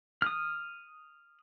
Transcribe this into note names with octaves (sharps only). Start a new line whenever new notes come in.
D#6 F6